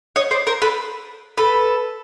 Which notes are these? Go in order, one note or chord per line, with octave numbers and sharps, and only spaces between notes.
C#5 D#5
C5 D5
A#4 C5
A4 B4
A4 B4